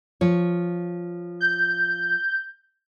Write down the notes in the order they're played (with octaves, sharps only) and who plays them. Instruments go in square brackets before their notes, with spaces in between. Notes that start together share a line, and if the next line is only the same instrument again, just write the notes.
[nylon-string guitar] F3 C#5
[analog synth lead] G6